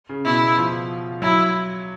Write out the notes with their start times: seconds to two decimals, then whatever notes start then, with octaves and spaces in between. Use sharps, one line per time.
0.09 C#3
0.25 B2 E4
0.58 F3
1.22 F#3 E4